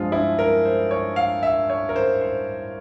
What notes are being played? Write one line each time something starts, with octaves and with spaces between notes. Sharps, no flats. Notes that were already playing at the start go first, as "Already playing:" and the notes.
Already playing: G2 F3 G#3 F4
E4
A#4
C5
C#5
F5
E5
C#5
A#4
C5
C5